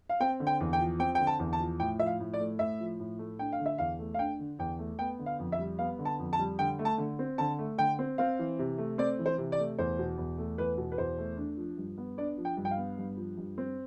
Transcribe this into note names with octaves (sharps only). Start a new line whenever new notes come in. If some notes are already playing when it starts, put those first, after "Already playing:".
F5
C4 G5
D3
G5
E2
G5
F3
C4 G5
G5
D3
A5
E2
A5
F3
A2 G5
F3 E5
F5
A2
D5
A3
A2 E5
F3
A2
A3
D4 G5
F5
D3
E5
E2 F5
A3
F5
D4 G5
D3
E2 G5
A3
B3 G5
D3
F5
F2
E5
G3
B3 F5
D3
A5
F2
A5
G3
D3 G5
A3
A5
D3
C4
D3 A5
A3
D3 G5
C4
C4 F5
E3
C3
A3
C4 D5
E3
C5
C3
D5
A3
E2 C5
B2
E2
A3
E2 B4
B2
B4
E2 C5
A3
D4
F3
G2
B3
D4 D5
F3
G5
G2
G5
F5
B3
G2
F3
G2
C4